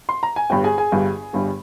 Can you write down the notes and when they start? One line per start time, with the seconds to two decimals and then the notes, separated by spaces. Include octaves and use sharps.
0.09 C6
0.23 A#5
0.36 G#5
0.50 G1 G2 G3 G5
0.64 G#4 G#5
0.78 G#4 G#5
0.92 G1 G2 G3
1.33 G1 G2 G3